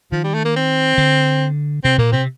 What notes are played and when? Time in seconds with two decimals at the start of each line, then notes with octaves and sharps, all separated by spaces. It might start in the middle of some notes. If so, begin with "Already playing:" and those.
0.12 D#3 F3
0.24 G3
0.34 A3
0.45 A#3
0.56 C4
0.98 D3
1.84 C3 C4
1.98 A#2 A#3
2.12 C3 C4